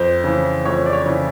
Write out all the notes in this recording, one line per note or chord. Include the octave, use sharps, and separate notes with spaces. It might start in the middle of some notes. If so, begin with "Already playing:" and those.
Already playing: F2 C5
C#3 E3
F2 C#5
D5
C#5
C#3 E3